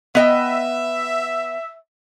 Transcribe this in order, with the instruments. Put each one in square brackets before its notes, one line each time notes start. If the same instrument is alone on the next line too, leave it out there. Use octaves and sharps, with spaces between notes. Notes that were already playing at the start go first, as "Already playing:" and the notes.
[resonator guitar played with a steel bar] B3 D#5 G5 [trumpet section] E5